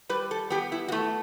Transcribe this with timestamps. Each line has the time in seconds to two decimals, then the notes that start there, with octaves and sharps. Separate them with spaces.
0.09 G3 B4
0.31 A4
0.50 B3 G4
0.72 E4
0.88 F#4
0.92 A3 E4